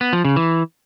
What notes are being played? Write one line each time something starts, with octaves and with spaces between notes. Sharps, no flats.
B3
F3
C#3
E3